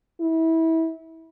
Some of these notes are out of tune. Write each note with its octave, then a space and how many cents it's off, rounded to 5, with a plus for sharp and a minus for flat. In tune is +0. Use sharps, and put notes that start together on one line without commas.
E4 -25